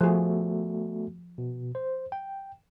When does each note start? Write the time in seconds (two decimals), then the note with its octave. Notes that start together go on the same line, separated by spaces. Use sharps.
0.01 F3 A3 B3 F#4 G#4
1.38 B2
1.75 C5
2.12 G5